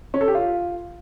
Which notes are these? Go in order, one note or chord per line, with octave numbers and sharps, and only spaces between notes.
C#4
A4
G4
F4